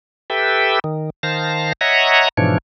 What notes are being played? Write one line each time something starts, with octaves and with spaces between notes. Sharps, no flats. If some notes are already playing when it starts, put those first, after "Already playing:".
G4 A4 B4 E5 G5
D#3
D#3 C5 F5 A5 A#6
C#5 D#5 E5 F#5 A#5
G#2 B2 E3 F3 D4 C#5